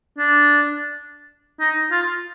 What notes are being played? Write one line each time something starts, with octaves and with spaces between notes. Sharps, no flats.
D4
D#4
F4